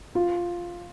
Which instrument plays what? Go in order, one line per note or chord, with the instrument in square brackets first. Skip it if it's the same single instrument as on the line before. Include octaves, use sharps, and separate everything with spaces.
[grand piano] F4